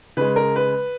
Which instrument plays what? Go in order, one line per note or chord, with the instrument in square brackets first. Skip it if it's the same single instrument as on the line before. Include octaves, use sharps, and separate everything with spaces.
[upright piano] C#3 G#3 B4
A#4
B4